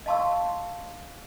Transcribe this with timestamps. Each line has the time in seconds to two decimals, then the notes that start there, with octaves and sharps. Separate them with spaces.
0.06 D#5 F5 A5 C6 C#6 E6